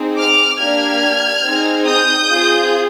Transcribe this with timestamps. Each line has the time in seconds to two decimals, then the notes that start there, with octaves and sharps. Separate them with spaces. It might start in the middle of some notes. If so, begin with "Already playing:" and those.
Already playing: C4 D#4 G#4
0.17 D6 F6
0.59 A#3 D4 G4 F6 G#6
1.45 C4 D#4 G#4
1.87 D#6 G6
2.31 C4 F4 G#4